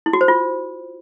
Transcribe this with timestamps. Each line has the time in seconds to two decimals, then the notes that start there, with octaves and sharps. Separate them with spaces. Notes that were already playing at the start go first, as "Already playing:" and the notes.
0.06 E4
0.13 F#4
0.21 C5
0.28 F4